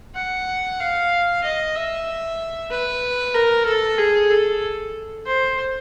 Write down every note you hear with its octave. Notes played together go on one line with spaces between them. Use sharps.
F#5
F5
D#5
E5
B4
A#4
A4
G#4
A4
C5